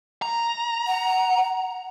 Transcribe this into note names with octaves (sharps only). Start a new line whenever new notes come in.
A#5
F#5